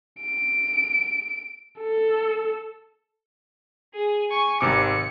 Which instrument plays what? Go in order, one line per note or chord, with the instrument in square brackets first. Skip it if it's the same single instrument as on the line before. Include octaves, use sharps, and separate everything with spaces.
[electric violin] D7
A4
[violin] G#4
G#5 C#6
[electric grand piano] G#1 C3 D6 [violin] C#7